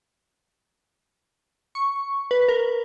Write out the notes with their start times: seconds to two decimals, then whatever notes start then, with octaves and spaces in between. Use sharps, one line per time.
1.75 C#6
2.31 B4
2.48 A#4